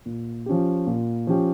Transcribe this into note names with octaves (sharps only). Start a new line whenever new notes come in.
A#2
F3 C#4 G4
A#2
F3 C#4 G4